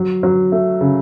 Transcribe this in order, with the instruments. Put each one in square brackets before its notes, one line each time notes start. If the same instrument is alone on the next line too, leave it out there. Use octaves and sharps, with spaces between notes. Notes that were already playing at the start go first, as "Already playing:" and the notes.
Already playing: [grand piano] F#3
F#3
A3
C#3